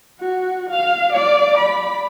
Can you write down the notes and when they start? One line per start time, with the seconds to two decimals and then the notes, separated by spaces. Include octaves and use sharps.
0.20 F#4
0.70 F5
1.13 D5
1.58 B5